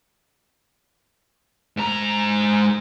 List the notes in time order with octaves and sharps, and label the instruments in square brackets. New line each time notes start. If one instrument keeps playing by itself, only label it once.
[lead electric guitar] G#2 A#5